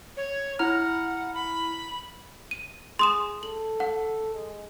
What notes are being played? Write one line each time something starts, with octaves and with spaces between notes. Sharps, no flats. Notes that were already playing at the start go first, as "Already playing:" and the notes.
C#5
E4 F#5 A#5 F6
B5
D#7
G#4 C6 D#6 E7
A4 F#7
F#5
G#3